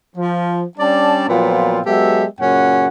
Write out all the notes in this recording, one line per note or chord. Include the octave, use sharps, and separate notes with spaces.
F3
G3 C#4 D4 D5 A5
A#2 F3 F#3 B3 C4 F4
F#3 G#3 B3 G4 A4 E5
F#2 A#2 C#3 C#4 F#5